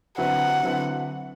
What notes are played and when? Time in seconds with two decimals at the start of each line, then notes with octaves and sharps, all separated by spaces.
0.18 D3 F#3 C4 E4 B4 F#5
0.63 D3 F#3 C4 E4 B4